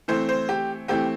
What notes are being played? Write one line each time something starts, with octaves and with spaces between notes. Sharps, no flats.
E3 A3 C4 C5
C5
G4
E3 A3 C4 G4